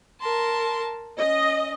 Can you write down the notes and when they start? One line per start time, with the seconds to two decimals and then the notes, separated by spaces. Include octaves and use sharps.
0.21 A#4 A5 C6
1.19 C#4 D#5